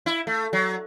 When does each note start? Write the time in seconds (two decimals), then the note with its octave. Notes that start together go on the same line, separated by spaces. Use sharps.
0.06 E4
0.27 A3
0.53 F#3